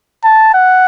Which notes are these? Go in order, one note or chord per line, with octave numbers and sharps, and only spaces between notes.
A5
F#5